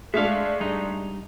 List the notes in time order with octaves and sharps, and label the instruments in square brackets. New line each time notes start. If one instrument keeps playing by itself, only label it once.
[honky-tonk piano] G#3 A3 D4 [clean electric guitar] E5 F5
[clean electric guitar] G2 D#4